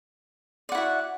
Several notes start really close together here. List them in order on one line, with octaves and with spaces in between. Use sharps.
D5 F#5 E4 F#4